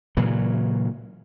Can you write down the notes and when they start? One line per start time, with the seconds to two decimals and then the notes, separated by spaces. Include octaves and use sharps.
0.17 A#2 C#3 E3 F#3